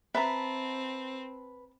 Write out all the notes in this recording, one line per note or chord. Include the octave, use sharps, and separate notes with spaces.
C4 B4 E5 A5 A#5